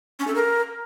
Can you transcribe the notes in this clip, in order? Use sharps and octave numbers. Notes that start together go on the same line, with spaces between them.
C#4
A4
A#4